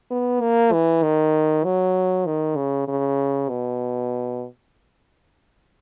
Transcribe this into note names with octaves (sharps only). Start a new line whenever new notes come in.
B3
A#3
E3
D#3
F#3
D#3
C#3
C#3
B2